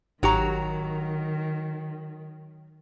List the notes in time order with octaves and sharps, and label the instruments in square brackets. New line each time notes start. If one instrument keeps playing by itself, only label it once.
[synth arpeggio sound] G#1 G4 C#6 [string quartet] D#3 [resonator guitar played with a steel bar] F#3 A#5